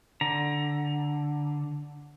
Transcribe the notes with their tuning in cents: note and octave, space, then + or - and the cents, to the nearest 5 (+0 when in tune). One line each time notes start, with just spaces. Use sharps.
D3 +0 A#5 +20